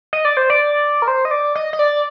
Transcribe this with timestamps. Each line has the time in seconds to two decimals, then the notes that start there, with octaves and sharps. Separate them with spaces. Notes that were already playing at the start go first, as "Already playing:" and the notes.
0.13 D#5
0.25 D5
0.37 C5
0.50 D5
1.02 A#4
1.08 C5
1.25 D#5
1.31 D5
1.55 D#5
1.73 D#5
1.79 D5